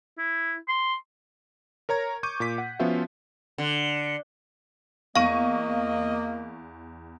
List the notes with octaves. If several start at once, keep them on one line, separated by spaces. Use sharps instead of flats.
E4
C6
A#4 C#5 A#5 G#6
C#6 D6 G6 D#7
A#2 D6 B6
F#5
F3 B3 C#4 F4 F#4 E5
D3
E2 A#3 D#5 F5 C#6 D#7